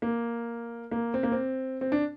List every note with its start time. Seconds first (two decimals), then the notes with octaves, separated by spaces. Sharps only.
0.02 A#3
0.91 A#3
1.14 C4
1.23 A#3
1.32 C4
1.81 C4
1.92 D4